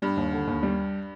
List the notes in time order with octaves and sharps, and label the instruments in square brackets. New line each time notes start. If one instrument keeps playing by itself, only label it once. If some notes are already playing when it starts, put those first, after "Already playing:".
[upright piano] G2 [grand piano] G3
[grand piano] D#2
D3
D#2
G3